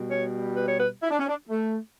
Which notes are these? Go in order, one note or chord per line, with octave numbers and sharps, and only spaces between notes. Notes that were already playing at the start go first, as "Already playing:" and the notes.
Already playing: B2 G3
C#5
B4
C#5
B4
E4
D4
C#4
D4
A3